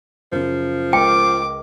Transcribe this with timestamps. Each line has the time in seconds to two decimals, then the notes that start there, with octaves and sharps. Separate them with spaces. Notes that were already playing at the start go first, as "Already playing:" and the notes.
0.32 F#2 C#3 F3
0.93 C#2 A#4 G5 D6